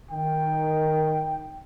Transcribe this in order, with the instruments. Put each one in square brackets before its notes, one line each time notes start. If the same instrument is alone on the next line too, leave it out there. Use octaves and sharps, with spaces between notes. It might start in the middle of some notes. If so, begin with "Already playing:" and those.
[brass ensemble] D#3 [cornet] G5